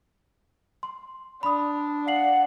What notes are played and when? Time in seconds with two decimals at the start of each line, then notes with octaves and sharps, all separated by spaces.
0.83 C6
1.43 D4 B5 D#6
2.07 F5 F#5 C7 F#7